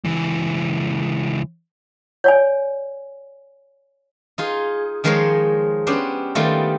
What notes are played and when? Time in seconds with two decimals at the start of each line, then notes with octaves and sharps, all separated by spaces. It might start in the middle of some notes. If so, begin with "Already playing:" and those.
0.04 C#2 E3
2.24 C#5 D5 G#5
4.38 D#4 F4 G#4
5.04 D#3 F3 G#3 A#4 C5 C#5
5.87 B3 C#4 D4 G4 C5
6.35 D#3 G3 A3 B3 F4